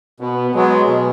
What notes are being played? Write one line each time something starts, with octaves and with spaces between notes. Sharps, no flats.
B2 B3
F#3 G#3 B3
B2